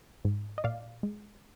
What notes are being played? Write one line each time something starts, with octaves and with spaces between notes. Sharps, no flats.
G#2
D#5
A#2 D5 F5
G#3